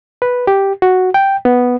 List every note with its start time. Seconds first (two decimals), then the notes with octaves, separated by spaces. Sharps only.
0.22 B4
0.47 G4
0.82 F#4
1.14 G5
1.45 B3